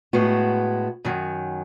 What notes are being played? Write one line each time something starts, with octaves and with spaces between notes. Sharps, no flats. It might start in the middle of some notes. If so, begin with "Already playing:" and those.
A2 G#3 B3 F#4
F#2 D#3 F#3